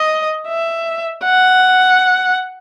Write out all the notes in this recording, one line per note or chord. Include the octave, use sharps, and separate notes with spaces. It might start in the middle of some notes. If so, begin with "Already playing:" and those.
Already playing: D#5
E5
F#5